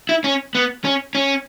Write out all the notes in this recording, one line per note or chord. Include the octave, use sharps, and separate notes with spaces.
E4
C#4
B3
C#4
C#4